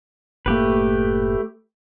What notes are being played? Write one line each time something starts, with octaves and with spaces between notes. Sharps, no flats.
F#1 A2 A3 A#3 G4 B4